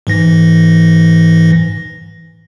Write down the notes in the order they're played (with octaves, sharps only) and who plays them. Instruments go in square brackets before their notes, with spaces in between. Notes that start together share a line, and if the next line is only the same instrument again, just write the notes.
[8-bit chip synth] G#2 E3 A#6